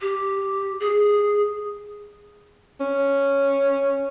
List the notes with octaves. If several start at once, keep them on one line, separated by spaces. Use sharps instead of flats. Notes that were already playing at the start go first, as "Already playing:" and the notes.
G4
G#4
C#4